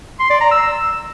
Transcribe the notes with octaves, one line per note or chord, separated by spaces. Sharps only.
C6
D5
A#5
E6